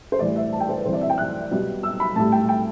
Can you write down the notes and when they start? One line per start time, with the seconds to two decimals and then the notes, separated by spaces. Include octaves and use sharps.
0.12 C5
0.19 A2 E3 G3 D5
0.36 E5
0.53 A5
0.60 G5
0.69 C5
0.77 B4
0.85 C3 E3 G3 C5
0.93 D5
1.02 E5
1.10 G5
1.18 F#6
1.51 B2 G3
1.83 E6
2.00 B5
2.16 A2 G3 A5
2.32 G5
2.49 G5